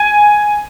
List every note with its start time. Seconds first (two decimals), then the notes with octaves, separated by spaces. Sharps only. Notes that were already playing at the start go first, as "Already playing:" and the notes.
Already playing: G#5